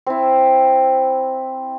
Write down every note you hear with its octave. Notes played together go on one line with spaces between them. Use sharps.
C4 E4